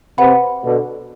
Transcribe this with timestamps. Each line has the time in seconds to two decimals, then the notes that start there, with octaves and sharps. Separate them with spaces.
0.18 C3 B4 F#5 B5
0.63 B2 D3